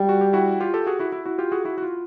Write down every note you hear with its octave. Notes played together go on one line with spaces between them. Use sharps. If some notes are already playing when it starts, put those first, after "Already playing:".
Already playing: G3
F#4
G4
E4 F#4
F4 G4
G4 A4
F#4 G#4
E4 F#4
E4
E4 F#4
F4 G4
F#4 G#4
E4 F#4
F#4
F4